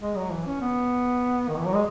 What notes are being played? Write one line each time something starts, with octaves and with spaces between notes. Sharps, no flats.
G#3
F#3
E3
C#4
B3
D#3
E3
F#3
G#3